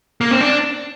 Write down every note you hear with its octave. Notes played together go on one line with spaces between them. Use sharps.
A#3
C4
D4